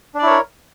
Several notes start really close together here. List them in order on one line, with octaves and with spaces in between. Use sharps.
D4 D5 E4 C#5 A#4